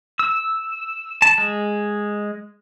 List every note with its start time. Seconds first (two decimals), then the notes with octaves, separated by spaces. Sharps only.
0.19 E6
1.22 A5
1.38 G#3